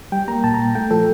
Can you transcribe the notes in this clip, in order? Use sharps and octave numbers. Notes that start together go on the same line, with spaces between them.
G3 G5
A#3 A#5
A#2 A5
A#5
A#2
A3 G5
F3 A4